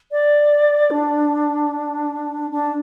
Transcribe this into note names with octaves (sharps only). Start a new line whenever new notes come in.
D5
D4
D4